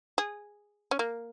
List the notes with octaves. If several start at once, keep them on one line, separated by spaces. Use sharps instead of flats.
G#4
C#4
A#3